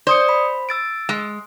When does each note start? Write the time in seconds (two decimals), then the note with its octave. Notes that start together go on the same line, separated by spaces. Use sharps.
0.07 C5 D5 D#6 C#7
0.29 B5
0.69 E6 A6 D7
1.09 G#3